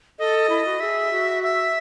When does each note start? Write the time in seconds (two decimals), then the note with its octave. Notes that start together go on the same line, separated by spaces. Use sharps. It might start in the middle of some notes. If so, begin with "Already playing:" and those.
0.19 A4 D#5
0.50 E4
0.65 F#4
0.80 G#4 E5
1.11 F#4
1.43 E5